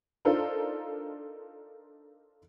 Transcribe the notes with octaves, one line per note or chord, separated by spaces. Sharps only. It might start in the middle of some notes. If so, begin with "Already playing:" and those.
D4 D#4 F4 A4 A#4 C5